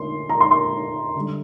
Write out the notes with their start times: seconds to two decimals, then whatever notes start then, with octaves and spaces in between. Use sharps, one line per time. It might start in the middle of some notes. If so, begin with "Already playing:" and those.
Already playing: D3 A3 C6
0.29 A#5
0.40 C6
0.51 C6
1.15 D3 G3